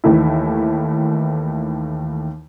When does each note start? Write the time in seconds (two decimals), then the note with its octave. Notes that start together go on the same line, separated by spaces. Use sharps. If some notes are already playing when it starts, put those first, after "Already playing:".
0.04 D#2 D#3 E3 A3 E4